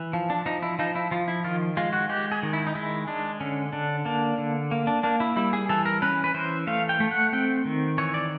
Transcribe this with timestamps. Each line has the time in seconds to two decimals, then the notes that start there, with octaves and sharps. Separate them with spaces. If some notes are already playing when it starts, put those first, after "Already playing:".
Already playing: E3
0.13 F3
0.30 D4
0.46 F3 D#4
0.63 E4
0.79 F3 D#4
0.95 E4
1.11 F3 F4
1.28 E4
1.44 D#3 F4
1.77 G#3 F4
1.93 F#4
2.09 G#3 G4
2.32 G#4
2.43 D#3
2.53 E4
2.67 D#4
2.75 G#3 E4
3.07 G#3 D4
3.40 D3 C#4
3.73 D3 D4
4.05 A#3 D4
4.38 D3
4.71 A#3
4.87 D4
5.03 A#3 D4
5.20 E4
5.36 G3 E4
5.53 G#4
5.69 E3 A4
5.85 A#4
6.02 C#4 B4
6.24 B4
6.34 E3 C5
6.67 A3 F5
6.89 G5
7.00 A3
7.11 F#5
7.33 C4 G5
7.65 D#3
7.98 E3 C#5
8.14 D5